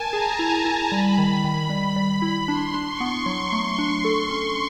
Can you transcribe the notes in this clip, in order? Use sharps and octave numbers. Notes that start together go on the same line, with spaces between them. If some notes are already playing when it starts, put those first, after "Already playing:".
Already playing: A#4 G#5 A5
G#4 A#5
E4
A#5
E4
G3 B5
D#3
D#3
G3
G3
E4
D4 C6
D4
C#6
B3
F#3 C6
A3
D4
A4
C#4